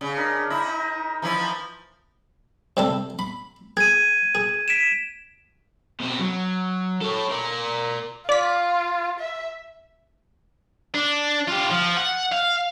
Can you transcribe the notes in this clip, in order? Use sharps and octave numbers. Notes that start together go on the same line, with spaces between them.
C#3
D4 A#4 D#5
D#4 E4 D#5
D#4
E3 F3 E4
C3 G3 A4
B5
G#4 G#6 D#7
G#4
B6 D7 E7
B2 C4
F#3
A4 C#5
A#4 D5
F4 D5 B6
E5
D4
F4 G4
F3
F#5
F5